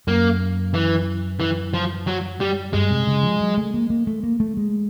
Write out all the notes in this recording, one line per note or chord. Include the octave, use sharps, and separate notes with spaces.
F#2 A#3
E3
E3
F3
F#3
G3
G2 G#3
C3
C#3
F3
F#3
A3
A#3
A#3
A3
A#3
A3
G#3